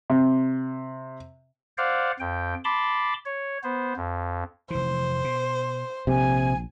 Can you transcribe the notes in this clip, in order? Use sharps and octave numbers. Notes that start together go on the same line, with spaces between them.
C3
C5 D5 F5 F#5
F2 G5
A5 B5 C6 D6
C#5
B3 C5
F2
F1 E3 C5
B2
A#1 C3 G#5